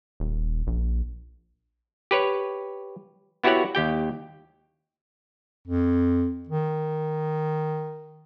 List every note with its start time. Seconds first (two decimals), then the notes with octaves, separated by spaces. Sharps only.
0.20 D#1
0.67 A#1
2.11 G4 B4 C#5
3.44 B3 E4 F#4 G4 C#5 F#5
3.75 D#2 G4 G5
5.67 F2
6.49 D#3